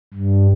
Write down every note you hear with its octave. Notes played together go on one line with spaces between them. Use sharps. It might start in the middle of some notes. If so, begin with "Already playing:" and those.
G2